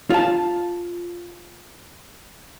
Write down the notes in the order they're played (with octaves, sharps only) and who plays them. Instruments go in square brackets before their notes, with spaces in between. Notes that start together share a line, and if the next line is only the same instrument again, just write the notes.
[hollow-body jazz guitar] F4 A5